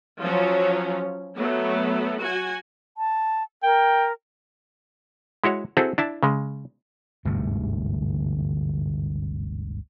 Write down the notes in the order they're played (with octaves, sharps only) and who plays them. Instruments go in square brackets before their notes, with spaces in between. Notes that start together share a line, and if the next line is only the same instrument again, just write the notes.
[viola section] F3 F#3 C#4
F#3 A3 B3
F#4 G#5
[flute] A5
[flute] A#4 [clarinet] G5
[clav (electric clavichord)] G#3 E4 F#4 C#5
C4 E4 F#4 G#4 A4 C5
D4 E4 A5
C#3 G#3
[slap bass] G1 D2 G#2 C3